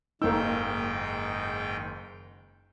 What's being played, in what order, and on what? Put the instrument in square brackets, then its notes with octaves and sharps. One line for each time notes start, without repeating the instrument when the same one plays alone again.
[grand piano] F#1 A4 E6 [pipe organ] G#2 D#3 G5 [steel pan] A#3 D#4